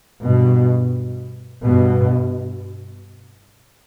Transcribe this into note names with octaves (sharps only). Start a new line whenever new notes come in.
G2 B2
G2 B2